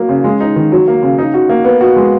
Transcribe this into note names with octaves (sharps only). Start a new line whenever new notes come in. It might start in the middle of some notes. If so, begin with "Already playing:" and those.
Already playing: F#3 A#3
C#3
G#3
D#4
D#3
F#3
A#3
C#3
D#4
F#4
A#3
B3
F#4
G#3